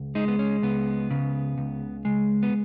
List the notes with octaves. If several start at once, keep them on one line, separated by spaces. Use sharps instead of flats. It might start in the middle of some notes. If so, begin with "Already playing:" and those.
Already playing: C#2
G#3 D#4
B3
C#4
C#2 B3
C#3
C#2
G#3
B3